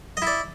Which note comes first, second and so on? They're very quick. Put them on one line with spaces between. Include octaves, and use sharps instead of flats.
D#5 E4 D5